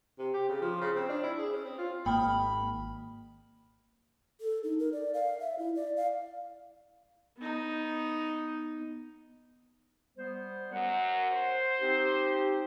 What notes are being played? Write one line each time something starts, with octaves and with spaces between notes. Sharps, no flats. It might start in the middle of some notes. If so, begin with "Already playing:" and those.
C3
G4
C#3
F3
C#3
C4
D4
E4
G#4
C#4
C4
F4
G#1 A#3 G5 B5 D#6 F6
A4
D#4
A#4
D5
F5
E5
E4
D5
F5
B3 D#4
G3 B3 C5
F#2 F#5
C5
C4 D#4 G4